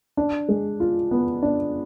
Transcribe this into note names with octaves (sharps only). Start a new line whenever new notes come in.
D4
G#3
F4
B3
D4